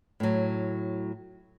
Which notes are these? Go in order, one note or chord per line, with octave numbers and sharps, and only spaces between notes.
A2 F#3